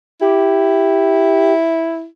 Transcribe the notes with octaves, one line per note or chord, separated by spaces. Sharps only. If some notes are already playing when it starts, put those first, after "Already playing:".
E4 G4